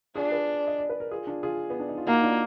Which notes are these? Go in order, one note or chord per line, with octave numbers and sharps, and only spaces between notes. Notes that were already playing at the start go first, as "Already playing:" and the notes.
D4 F4 G#4
G#4 B4
D#5
D5
B4
A#4
F4 G#4
D4 F4
F4 G#4
B3
D4
D#4
F4
A#3 D#4 F#4
D4 F4